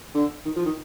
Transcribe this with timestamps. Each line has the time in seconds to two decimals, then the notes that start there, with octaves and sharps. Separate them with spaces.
0.14 D3
0.45 D#3
0.56 F3
0.65 D#3